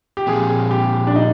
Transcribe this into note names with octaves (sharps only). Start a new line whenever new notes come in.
G4
A#2 F3 C4 G#4
G4
D4
D#4